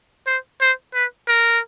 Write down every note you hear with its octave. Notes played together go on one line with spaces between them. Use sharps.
C5
C5
B4
A#4